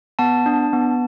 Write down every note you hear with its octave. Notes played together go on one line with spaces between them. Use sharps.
B3 A5
D4
B3